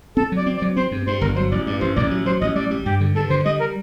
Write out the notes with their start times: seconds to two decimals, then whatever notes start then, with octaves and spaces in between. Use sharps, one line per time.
0.17 C4 A4
0.32 F#3
0.37 D5
0.46 C4
0.57 D5
0.62 F#3
0.77 C4 C5
0.92 G2
1.07 G2 C5
1.21 G1 A#4
1.36 F#3 C5
1.51 A1 D5
1.66 G2 D5
1.81 A1 C5
1.96 A1 D5
2.11 F#3
2.26 F#3 C5
2.41 A1 D#5
2.56 G3 D5
2.71 G3
2.86 G2 G4
3.01 D3
3.15 G2 A4
3.30 D3 C5
3.45 G3 D#5
3.60 A#4